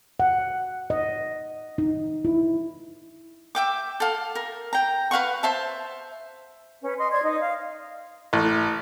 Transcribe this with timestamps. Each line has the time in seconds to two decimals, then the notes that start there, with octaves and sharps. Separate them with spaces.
0.20 F#5
0.90 D#5
1.78 D#4
2.25 E4
3.55 E5 G5 D6
4.00 A4 F5
4.35 A#4
4.73 G5 A#5
5.11 B4 F5 F#5 C#6
5.43 C5 E5 A5
6.82 C#4 B4
6.98 D#5 C6
7.12 C5 D5 C6 G#6
7.23 D#4 D#5
7.40 F5
8.33 A1